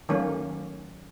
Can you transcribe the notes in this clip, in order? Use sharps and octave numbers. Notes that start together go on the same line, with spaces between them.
D#3 F#3 A3 A#3 C#4